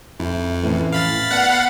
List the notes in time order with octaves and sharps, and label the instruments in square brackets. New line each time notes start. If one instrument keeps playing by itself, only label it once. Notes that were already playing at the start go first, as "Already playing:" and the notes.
[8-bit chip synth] F2 [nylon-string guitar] F3 E4
[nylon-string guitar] A2 C#4 [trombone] E3
[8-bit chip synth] F5 B5 A6
[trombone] B3 [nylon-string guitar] D5 A5 [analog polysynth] F#5